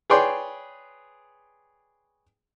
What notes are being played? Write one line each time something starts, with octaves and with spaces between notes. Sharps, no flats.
G#4 B4 C#5 D5 G5 C6